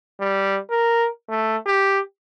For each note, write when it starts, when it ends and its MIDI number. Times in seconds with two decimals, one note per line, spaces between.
0.20 0.59 55
0.70 1.08 70
1.29 1.57 57
1.66 1.99 67